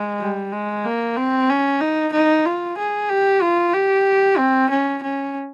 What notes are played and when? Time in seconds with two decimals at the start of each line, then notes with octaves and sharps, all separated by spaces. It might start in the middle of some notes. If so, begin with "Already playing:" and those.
Already playing: G#3
0.20 G3
0.52 G#3
0.84 A#3
1.16 C4
1.49 C#4
1.81 D#4
2.13 D#4
2.45 F4
2.78 G#4
3.09 G4
3.41 F4
3.74 G4
4.38 C4
4.70 C#4
5.03 C#4